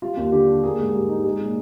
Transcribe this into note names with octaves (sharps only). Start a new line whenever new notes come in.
G3 F4
D#2
D3 G4
D4
A#3 G#4
G#2
G3
D#4
G#3
A#2